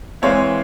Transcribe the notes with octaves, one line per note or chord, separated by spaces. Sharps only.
E3 G#3 C4 E4 C#5 F5